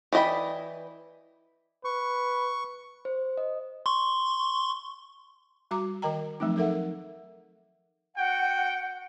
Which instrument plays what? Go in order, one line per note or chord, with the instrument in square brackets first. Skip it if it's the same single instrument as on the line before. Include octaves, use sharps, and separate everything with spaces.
[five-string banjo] E3 D5 D#5 G5 B5
[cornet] B4 [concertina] C#6
[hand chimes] C5
D#5
[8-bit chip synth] C6 C#6
[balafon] G3 F#4 A#5 D6
D#3 A#4 D#5 G5 A#5
F3 F#3 A3 C4 D#4
D#4 A4 A#4 E5 F#5
[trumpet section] F#4 G5 [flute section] F#5